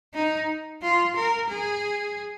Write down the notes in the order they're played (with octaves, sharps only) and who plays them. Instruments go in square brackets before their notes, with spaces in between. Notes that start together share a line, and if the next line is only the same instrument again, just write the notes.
[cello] D#4
F4
A#4
G#4